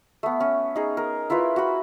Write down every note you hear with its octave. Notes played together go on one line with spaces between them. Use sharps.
A3 B3
C#4
D#4 G#4
A#4
E4 F4 A#4 B4
F#4 B5